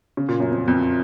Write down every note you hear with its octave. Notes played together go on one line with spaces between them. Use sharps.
C#3
A#2
F#2
F2
F2